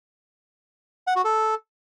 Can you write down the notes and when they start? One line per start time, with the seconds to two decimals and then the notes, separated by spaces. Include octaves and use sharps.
1.07 F#5
1.16 F#4
1.25 A4